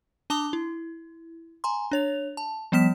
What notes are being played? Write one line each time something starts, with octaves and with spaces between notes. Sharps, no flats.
D4 A5 D6 D#6 G7
E4
G#5 A#5 C6
D4 C#5 F7
A5
F3 G3 B3 F6 B6 E7